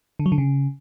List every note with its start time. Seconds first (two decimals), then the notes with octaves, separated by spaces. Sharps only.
0.19 D3
0.26 F#3
0.32 D3
0.38 C#3